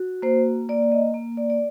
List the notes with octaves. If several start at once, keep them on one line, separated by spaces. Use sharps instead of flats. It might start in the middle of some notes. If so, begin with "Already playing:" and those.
Already playing: F#4
A#3 C5
A#3 D5
D5
D#5
A#3
D5
D5